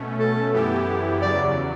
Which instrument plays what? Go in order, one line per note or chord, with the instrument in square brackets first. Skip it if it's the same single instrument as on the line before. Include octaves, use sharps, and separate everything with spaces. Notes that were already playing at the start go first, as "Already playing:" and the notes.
Already playing: [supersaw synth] B2 A3 C#4
[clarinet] A4
[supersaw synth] F#2 E3 B3 E4 G4
[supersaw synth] E2 C#3 F#3 [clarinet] D5